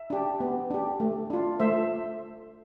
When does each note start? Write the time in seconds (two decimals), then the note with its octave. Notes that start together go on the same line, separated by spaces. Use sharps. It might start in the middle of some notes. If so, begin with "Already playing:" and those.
Already playing: E5
0.10 D4 G4
0.40 B3
0.70 D4 G4
1.00 A3
1.30 D4 F4
1.59 A3 C5 E5